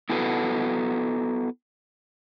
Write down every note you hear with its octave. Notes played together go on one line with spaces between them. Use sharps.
B3 E4 F#4 A4 B4